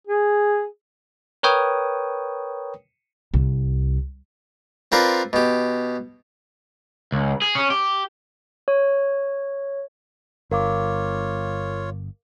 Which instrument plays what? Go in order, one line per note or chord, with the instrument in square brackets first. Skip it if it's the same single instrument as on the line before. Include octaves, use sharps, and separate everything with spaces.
[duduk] G#4
[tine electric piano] A#4 B4 C#5 G5 D#6
[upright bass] C2
[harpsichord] C4 F4 A#4 B4 D5
B2 G4
[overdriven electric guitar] C#2
G#4
C#4
G4
[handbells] C#5
[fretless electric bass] G1 [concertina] F4 C#5 [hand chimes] A#4 F5 D6